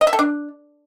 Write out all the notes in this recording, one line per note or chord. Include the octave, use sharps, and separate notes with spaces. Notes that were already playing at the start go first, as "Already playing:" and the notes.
D#5
E5
A4
D4